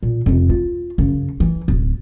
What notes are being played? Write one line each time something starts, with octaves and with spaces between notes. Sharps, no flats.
A#2
F2 C3
F4
F#2 C#3
E3
D1